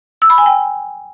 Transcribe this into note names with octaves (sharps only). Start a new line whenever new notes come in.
E6
B5
G#5
G5